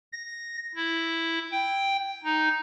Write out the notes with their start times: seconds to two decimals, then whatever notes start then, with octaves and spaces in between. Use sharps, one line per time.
0.13 A#6
0.75 E4
1.52 G5
2.24 D#4